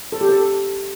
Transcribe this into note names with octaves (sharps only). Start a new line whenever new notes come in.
A4
G4
A4